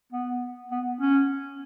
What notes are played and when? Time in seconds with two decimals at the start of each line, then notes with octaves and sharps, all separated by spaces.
0.12 B3
0.71 B3
1.01 C#4